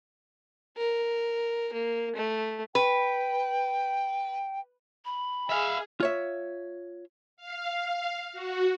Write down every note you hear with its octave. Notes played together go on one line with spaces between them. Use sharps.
A#4
A#3
A3
B4 G5
B5
G#4 E5 F5
F4 C#5 E5
F5
F#4